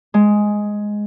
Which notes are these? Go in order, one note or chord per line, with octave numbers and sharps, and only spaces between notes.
G#3